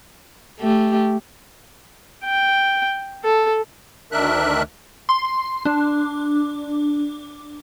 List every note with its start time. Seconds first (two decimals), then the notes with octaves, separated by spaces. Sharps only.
0.60 A3 G4
2.25 G5
3.24 A4
4.12 D2 D#3 D4 A#4 E5 F#6
5.09 C6
5.65 D4